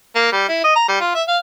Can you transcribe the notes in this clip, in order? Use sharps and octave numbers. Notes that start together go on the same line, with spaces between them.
A#3
G3
E4
D#5
A#5
G3
F4
E5
F5